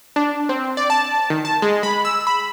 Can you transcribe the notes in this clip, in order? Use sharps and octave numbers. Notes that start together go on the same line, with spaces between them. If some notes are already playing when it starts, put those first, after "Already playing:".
D4
C4
D5
A5
D#3
A5
G#3
B5
E6
B5